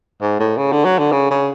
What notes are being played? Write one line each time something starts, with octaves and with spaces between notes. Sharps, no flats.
G#2
A2
C#3
D3
F#3
D3
C#3
C#3